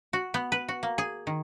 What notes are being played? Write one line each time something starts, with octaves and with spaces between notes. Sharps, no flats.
F#4
B3
B4
F#4
A#3
G#4
D#3